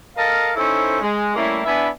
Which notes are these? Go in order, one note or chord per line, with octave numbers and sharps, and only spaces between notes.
A4 A#4 D#5 F5
C#4 D#4 E4 A4 C5
G#3
G3 A3 A#3 C#4 E4
B3 D4 E4 E5 G#5 B5